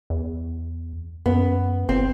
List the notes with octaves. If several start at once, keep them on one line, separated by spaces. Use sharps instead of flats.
E2
F#2 B3
G1 C4